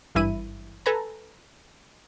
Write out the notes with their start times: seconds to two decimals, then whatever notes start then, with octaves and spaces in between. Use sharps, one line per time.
0.15 G#1 G2 E3 E4 D#7
0.86 A4 B4 G#5 A#5